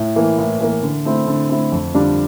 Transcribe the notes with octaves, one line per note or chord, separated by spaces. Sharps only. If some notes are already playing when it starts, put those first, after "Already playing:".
Already playing: A2
E3 A#3
A2
E3 A#3
D3
A3 C4 E4
D3
A3 C4 E4
F2
D3 G3 D4 F4